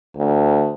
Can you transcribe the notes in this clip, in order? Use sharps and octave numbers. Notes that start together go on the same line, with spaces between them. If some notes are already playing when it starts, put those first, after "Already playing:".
D2